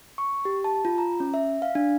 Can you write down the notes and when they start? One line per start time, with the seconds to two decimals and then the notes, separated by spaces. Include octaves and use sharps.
0.18 C#6
0.45 G4
0.64 A5
0.85 F4
0.98 A#5
1.20 C#4
1.34 E5
1.62 F5
1.75 D4